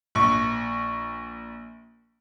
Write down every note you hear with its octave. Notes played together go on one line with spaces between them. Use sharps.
A#1 C#6